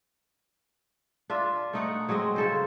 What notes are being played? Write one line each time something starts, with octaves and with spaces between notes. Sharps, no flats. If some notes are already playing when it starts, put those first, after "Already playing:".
D4 F4 E5
A3 D#4 F#5
F#3 G#3 C4 D#5
C#3 A4 C5